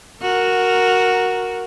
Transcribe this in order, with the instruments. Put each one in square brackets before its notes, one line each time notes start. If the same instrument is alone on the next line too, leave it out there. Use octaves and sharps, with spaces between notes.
[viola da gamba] F#4 A#4